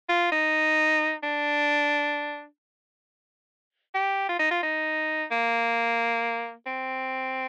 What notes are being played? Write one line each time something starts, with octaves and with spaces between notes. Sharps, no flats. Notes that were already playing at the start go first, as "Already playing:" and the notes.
F4
D#4
D4
G4
F4
D#4
F4
D#4
A#3
C4